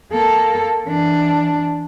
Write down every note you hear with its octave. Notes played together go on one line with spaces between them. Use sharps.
A#3 A4
E3 D4